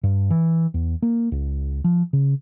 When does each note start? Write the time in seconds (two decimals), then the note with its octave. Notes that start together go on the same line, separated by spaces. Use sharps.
0.03 G2
0.30 E3
0.74 E2
1.02 A#3
1.32 C#2
1.84 F3
2.13 C#3